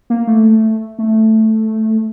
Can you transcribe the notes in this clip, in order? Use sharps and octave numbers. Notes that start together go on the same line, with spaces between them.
A#3
A3
A3